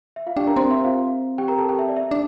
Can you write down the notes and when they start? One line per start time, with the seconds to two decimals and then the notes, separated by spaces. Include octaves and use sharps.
0.16 E5
0.26 F4 F5
0.37 D4 G4 G5
0.47 A#4 A#5
0.56 C4 C5 C6
0.71 E5
0.84 F4 F5
1.38 G4 G5
1.48 A#4 A#5
1.58 A4 A5
1.69 G4 G5
1.79 E5
1.89 D5
1.96 E5
2.11 D4